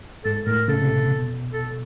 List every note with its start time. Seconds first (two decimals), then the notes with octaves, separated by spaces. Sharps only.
0.25 G#2 A4
0.47 A2 A#4
0.68 C#3 A4
0.82 C3
0.96 A#2
1.10 B2
1.53 A4